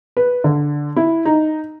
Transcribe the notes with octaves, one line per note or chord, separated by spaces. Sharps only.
B4
D3
E4
D#4